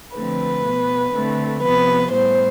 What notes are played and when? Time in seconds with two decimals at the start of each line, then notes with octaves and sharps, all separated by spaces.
0.15 D3 F3 A3 C4 B4
0.65 B2 B3
1.14 D3 A3 C4
1.62 C3 F3 B3 B4
2.12 A2 G3 B3 C5